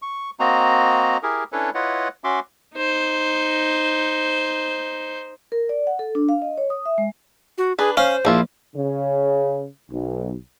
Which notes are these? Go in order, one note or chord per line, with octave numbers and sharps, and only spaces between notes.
C#6
A#3 C4 F#4 D#5 A#5
E4 G4 G#4 A#4
C#4 D4 E4 A4 B4 C#5
E4 F4 B4 C#5 D#5 F#5
C#4 F#4 E5 C6 D6
D#4 C5
A#4
D5
F#5
A4
D4
F5
D#5
C#5
D#6
E5
G#3
F#4
D4 G#4 B4
C#4 C5 F5
A#1 F3 E4 F4
C#3
B1